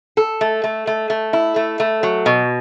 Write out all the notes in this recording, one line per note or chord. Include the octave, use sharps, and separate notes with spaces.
A4
A3
A3
A3
A3
E4
A3
A3
F#3
B2